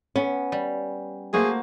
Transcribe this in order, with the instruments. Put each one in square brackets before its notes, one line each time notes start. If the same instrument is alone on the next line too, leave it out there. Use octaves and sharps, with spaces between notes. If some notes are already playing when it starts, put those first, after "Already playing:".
[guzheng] B3 [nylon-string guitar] C#4
[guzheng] G3
[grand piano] A3 A#3 C5 [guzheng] F#4 [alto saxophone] G#4